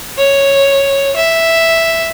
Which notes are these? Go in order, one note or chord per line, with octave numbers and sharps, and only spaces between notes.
C#5
E5